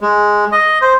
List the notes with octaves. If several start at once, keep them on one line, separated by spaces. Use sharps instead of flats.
G#3
D#5
C5